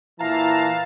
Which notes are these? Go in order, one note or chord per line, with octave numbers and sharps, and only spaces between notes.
A#2 E3 F5 A5 A#5